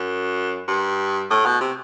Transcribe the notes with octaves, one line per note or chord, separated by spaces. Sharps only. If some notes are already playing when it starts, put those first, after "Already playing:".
Already playing: F#2
G2
A2
B2
C3